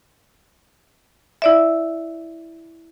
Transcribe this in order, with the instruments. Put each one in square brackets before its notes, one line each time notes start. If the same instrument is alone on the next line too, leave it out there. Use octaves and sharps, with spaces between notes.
[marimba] E4 D5 E5